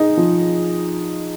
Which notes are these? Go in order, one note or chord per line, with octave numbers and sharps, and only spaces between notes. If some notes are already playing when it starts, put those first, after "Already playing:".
Already playing: D#4 G#4
F3